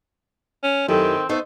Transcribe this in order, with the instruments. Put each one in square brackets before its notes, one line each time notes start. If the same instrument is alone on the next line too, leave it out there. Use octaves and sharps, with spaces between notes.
[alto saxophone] C#4
[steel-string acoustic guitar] F#2 E4 G4 [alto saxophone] D#3 [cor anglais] C4 [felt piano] A4
[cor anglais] A3 [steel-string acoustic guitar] B3 D#4 C5